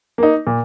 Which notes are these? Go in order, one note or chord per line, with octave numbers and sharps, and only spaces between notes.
A#3 D#4
A#2